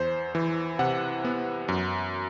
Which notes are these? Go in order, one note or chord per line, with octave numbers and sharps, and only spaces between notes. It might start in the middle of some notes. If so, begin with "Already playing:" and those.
Already playing: E2 C5
E3
C3 F#5
B3
F#2